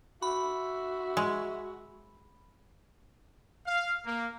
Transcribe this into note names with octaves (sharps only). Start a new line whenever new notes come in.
F#4 E5 B5
G#3
F5
A#3